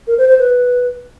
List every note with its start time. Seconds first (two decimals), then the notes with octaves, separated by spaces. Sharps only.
0.07 A#4
0.18 C5
0.28 C5
0.39 B4